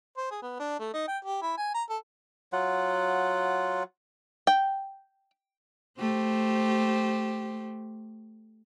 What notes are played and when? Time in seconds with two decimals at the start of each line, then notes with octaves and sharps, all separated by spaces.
0.17 C5
0.31 G#4
0.42 B3
0.59 D4
0.79 A3
0.94 D#4
1.08 G5
1.24 G4
1.42 E4
1.57 G#5
1.74 A#5
1.89 A4
2.53 F#3 F4 F#5
4.47 G5
6.00 A3 G4 C5